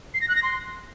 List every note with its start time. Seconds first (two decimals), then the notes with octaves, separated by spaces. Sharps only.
0.14 C7
0.21 A#6
0.28 F#6
0.36 A#6
0.43 C6